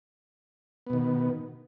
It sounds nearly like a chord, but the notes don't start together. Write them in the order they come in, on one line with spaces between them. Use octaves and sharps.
B3 B2 D#3